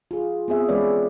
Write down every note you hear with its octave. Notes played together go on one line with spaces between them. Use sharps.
F4 G#4
B3 C4 G#4 E5
E3 G#3 C#4 B4 C#5 D5